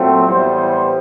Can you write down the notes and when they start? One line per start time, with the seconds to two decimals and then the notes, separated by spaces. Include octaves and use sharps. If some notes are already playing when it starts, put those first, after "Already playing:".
Already playing: A#2 F#3 A3 C4
0.25 A2 E3 G3 B3 C5